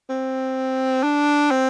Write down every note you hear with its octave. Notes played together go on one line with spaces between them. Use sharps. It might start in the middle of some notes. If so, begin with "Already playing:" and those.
C4
D4
C4